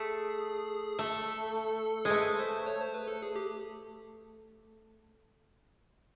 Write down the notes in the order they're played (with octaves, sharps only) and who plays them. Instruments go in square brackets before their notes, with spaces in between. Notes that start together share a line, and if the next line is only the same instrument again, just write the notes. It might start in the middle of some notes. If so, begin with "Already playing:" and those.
Already playing: [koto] A3 [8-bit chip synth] G#4
[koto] A3 [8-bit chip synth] A4
[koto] G#3
[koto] A3 [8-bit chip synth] B4
[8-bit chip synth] C5
C#5
C5
B4
A4
G#4
G4